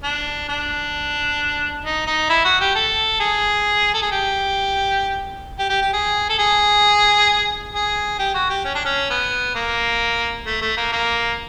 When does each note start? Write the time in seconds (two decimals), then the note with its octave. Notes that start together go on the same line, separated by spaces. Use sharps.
0.04 D4
0.49 D4
1.85 D#4
2.07 D#4
2.30 E4
2.44 F#4
2.60 G4
2.75 A4
3.20 G#4
3.94 A4
4.02 G#4
4.12 G4
5.59 G4
5.70 G4
5.82 G4
5.93 G#4
6.29 A4
6.39 G#4
7.74 G#4
8.19 G4
8.35 F#4
8.50 G4
8.65 C#4
8.75 D4
8.85 C#4
9.10 B3
9.55 A#3
10.46 A3
10.62 A3
10.77 A#3
10.92 A#3